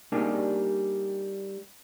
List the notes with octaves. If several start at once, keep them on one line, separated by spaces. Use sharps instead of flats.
G3 A#3 D4 D#4 G4 G#4